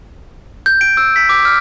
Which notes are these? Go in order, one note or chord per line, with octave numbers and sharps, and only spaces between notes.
G6
D7
E6
B6
D6
F6